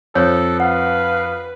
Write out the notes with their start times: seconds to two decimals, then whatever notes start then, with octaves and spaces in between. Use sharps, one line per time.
0.15 F2 A4 C5 C#5
0.60 B4 F5 F#5